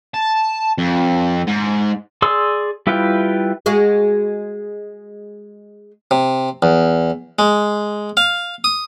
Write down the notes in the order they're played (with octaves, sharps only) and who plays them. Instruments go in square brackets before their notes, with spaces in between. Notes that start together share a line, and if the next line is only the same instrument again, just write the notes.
[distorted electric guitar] A5
F2
G#2
[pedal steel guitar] G#4 D5 C6 E6
G3 E4 F4 B4 G5
[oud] G#3 F#4 G#4
[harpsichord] C3
E2
G#3
F5
D#6